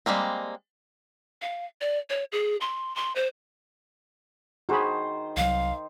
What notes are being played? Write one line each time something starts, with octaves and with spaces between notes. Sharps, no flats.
G3 G#3 A#3 C4
F5
D5
C#5
G#4
C6
C6
C5
D#3 F#4 G#4 C5 B5
C2 E3 F#3 F5